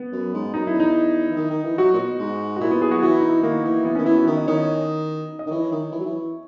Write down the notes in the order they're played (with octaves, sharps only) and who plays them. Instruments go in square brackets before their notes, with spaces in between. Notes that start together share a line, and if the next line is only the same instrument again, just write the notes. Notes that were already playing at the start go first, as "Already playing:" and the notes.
Already playing: [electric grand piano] B3
[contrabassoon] F#2
G#2
[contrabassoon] F#2 [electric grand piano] D#4
[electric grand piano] E4
[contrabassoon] E2
[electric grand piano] D#4
[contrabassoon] E3
D#3
D#3
E3
[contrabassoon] F#3 [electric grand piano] F#4
[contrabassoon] A#2
B2
G#2
[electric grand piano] F#4
[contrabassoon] A#2 [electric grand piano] E4
[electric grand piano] B3
[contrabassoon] F#3 [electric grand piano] G#4
[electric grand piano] F#4
[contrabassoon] E3 [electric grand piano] F#4
[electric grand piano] E4
D#4
E4
[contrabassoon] D#3 [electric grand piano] A#3
[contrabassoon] E3
[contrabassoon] E3 [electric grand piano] B3
[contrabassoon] D#3 [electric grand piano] C#4
[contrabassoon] E3 [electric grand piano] E4
[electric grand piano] F#4
[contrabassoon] D#3 [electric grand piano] E4
[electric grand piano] D#5
[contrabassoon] D#3 [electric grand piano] C#5
[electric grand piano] D#5
D#5
[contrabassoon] D#3
[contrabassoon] E3 [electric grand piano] C#5
[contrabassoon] D#3
E3
F#3
E3